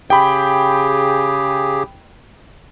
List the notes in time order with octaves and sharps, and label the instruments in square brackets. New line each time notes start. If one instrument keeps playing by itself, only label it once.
[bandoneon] C#3 G4 G#4 [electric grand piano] G5 B5